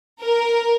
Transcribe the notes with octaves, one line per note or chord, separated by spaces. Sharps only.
A#4